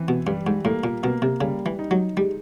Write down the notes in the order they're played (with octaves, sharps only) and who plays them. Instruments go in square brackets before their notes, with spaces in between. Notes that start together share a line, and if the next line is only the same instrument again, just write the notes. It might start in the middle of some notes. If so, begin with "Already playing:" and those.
Already playing: [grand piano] E3 C4
[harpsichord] B2
[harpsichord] G2 [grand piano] G3
[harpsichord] G#2
[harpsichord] A2 [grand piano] A#3
[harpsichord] A#2
[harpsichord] B2 [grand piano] A#3
[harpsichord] C3
[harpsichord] C#3 [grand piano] G3
[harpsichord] E3
[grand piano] D#4
[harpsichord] F#3
[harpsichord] G3 [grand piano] G#3